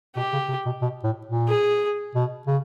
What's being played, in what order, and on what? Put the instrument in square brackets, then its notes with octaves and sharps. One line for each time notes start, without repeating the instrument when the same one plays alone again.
[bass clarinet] B2 [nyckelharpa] G4
[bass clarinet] C#3
C3
B2
B2
A2
A#2
[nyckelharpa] G#4
[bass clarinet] B2
C#3